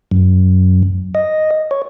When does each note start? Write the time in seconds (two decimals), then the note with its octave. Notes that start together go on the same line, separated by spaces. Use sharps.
0.11 F#2
1.15 D#5
1.71 C#5